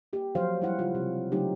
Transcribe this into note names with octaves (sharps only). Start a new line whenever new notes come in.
A#3 G4
F3 F#3 F#4 C5 F5
G3 E4 F#5
C#3 G3 F4
C3
C#3 F#3 A3 D#4 G4